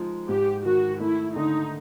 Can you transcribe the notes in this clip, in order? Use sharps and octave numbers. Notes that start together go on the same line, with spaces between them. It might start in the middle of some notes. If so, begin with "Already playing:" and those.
Already playing: F3 G#3 D#4
G#2 G4
D#3 F#4
A3 E4
D3 D#4